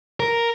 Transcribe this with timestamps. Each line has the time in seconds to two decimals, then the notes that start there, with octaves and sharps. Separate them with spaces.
0.20 A#4